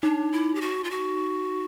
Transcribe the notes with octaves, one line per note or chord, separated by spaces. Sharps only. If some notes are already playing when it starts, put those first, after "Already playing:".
D4 D#4
E4
G4
F#4
F4
F#4